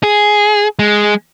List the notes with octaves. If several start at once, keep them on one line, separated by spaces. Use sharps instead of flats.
G#4
G#3